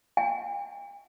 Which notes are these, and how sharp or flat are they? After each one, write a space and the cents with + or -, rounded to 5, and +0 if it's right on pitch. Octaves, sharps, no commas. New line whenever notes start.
G5 +45